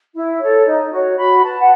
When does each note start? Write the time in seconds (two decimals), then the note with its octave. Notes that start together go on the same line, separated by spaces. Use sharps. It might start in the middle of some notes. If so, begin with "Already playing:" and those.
0.13 E4
0.39 A4 C#5
0.65 D#4
0.91 F#4 C#5
1.17 F#4 B5
1.43 B4 A5
1.59 F#5